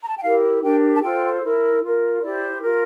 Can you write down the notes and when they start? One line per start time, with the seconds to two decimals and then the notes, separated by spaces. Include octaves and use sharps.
0.01 A#5
0.08 A5
0.17 G5
0.23 E4 G4 A#4 F5
0.63 D4 G4 A#4 G5
0.95 A5
1.03 F4 A4 C5 G5
1.43 E4 A#4
1.83 F4 A#4
2.23 E4 G4 C5 D5
2.63 F4 A#4